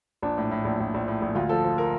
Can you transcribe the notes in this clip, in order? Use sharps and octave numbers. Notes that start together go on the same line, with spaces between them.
A#1 D4
A2
A2
A#1
A#1
A#1
A2
A#1
D2 F4
F3 A4
F3
A#4